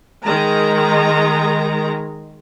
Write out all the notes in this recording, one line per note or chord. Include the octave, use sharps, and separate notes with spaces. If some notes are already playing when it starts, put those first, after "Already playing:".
D#3 G#3 A#5